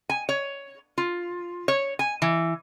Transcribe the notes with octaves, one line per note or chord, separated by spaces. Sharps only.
G#5
C#5
F4
C#5
G#5
E3